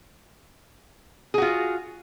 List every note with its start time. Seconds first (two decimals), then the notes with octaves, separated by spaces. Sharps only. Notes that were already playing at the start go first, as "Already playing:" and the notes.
1.34 G#4
1.38 F#4
1.42 F4